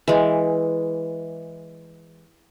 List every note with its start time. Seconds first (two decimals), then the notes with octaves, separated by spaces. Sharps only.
0.08 E3 G#3